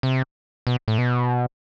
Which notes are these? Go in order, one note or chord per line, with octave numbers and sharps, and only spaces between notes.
C3
B2
A2
B2